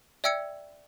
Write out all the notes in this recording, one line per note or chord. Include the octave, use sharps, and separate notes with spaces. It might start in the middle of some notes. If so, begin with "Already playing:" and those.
D5 E5 G5 E6 G#6 C#7